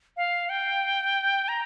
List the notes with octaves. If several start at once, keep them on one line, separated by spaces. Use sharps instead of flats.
F5
G5
A#5